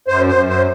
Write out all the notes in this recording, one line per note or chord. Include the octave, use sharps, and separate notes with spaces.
F#2 C5
C5
F#2
C5